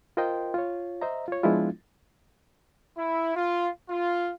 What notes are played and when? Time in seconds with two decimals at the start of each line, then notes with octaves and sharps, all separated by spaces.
0.17 F4 A#4 C5 D#5 G5 C6
0.54 F4 C#5
1.02 C5 D#5 E5 A#5
1.28 F4 C#5
1.43 F3 G#3 B3 D4 E4 F4
2.97 E4
3.35 F4
3.89 F4